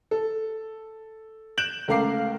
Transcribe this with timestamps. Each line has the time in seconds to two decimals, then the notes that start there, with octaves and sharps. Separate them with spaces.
0.11 A4
1.57 F#6 G6 D7 E7 F#7
1.88 C#2 A3 A#4 F5 D6 C7